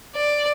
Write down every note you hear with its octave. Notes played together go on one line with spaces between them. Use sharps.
D5